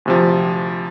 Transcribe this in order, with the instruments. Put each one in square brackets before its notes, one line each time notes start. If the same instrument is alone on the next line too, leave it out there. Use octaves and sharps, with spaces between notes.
[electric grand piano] D2 C3 F3